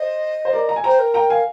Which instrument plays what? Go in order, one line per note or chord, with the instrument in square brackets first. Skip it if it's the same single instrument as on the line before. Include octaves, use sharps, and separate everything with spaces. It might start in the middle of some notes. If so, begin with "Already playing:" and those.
Already playing: [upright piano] C5 [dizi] D#5
[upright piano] C5
A#4 D5
A#5
G#5
[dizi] C5 [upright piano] G5 A#5
[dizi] A#4
[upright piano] G5 A#5
F5 G#5